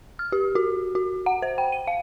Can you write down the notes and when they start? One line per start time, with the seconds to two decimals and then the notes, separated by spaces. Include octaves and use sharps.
0.19 F6
0.32 G4
0.55 F#4
0.95 F#4
1.26 F#5
1.42 C5
1.58 G5
1.72 D#7
1.87 F5